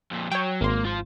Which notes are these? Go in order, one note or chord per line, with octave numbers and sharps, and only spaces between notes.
F2 A#2
F#3 C#5 G5
G#1 A#3 C6
F4 C5